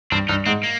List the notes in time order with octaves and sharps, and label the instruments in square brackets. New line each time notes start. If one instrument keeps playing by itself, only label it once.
[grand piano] G2 [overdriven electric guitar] C4
[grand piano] G2 [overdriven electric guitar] D#4
[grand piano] G#2 [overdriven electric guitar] C4
[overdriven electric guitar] A#3